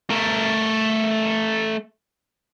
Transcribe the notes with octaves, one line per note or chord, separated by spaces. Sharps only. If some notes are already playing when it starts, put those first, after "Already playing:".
A3 A#4